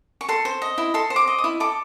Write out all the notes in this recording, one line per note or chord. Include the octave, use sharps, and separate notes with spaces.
C#6
A4 C6
C5
D#5
E4
A4 C6
C5
D6
D#5
D#6
E4
A4 D6